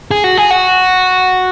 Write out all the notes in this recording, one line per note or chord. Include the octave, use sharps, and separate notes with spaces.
G#4
F#4
G#4
F#4